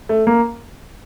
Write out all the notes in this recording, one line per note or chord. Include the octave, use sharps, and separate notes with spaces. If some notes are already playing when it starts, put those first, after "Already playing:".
A3
A#3